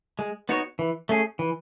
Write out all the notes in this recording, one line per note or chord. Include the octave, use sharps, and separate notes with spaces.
G#3
B3 D#4 F#4 C#5
E3
A3 C#4 G#4
E3